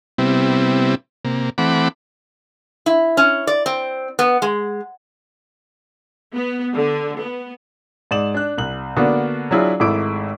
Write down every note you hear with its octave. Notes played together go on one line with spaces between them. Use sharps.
C3 G3 B3 C4 E4
C3 A#3
E3 A3 C4 F#5 B5 D6
E4
C#4
D5
C4
B3
G#3
B3
D3
B3
G#2 D5 E7 F#7
D4 F#6
C2 F#7
D3 A#3 B3 D4 F#4
F#3 D4 E4 F4 G#4
G#1 G#2 A3 E4 D6 D7